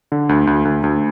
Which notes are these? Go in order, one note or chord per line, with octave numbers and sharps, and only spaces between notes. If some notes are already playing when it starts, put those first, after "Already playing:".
D3
D2
D2
D2
D2